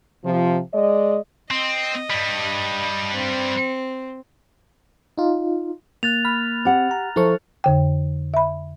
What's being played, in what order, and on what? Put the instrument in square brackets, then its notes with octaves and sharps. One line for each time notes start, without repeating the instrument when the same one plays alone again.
[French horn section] C3 F3
G#3 D5 D#5
[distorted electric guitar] C4 [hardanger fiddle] D#5
[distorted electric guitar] G2 G3
[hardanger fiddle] C4
[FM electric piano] D#4 F4
[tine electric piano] A#3 [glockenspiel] F#6 A6 F7
[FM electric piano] B5 [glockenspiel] F6
[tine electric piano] C4 [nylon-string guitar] G4 F#5
[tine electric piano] A#5
[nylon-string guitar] F3 [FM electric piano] E4 A4 C#6
[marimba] F2 D3 G5
E5 B5